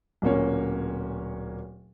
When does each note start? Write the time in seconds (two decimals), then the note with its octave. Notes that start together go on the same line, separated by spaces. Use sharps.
0.22 D1 A#2 A#3 C#4 C#5